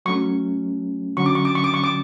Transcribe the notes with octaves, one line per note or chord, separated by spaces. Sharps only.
F#3 A3 C#4 C#6
D3 F#3 C#4 C#6
D6
C#6
D6
C#6
D6
C#6
D6